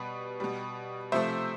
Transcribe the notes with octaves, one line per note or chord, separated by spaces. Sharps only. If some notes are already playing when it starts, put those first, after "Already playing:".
Already playing: B2 G3 B4
B2 G3
C3 F3 A3 C5 E5